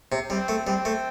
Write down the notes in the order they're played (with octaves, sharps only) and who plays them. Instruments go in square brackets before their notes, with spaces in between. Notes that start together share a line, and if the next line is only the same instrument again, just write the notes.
[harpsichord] C3
[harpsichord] G3 [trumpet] C4
[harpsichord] A3
[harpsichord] G3 [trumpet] C4
[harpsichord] A3